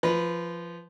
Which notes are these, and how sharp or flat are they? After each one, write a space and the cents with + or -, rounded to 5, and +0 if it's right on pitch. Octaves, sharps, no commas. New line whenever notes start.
F3 -15 B4 +0